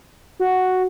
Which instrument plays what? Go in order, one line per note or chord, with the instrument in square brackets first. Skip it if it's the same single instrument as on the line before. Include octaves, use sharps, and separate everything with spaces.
[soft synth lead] F#4